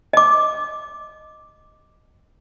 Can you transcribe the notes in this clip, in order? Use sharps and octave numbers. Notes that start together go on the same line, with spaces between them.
D#5 D6